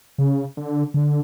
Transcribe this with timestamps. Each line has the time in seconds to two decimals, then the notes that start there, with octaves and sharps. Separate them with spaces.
0.18 C#3
0.57 D3
0.94 D3